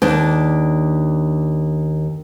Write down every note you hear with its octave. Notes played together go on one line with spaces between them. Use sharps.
D#2 D4